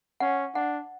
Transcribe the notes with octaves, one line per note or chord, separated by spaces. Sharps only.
C#4 F#5
D4 F#5